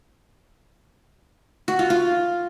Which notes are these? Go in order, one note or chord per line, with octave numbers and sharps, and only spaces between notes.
F#4
F4
F4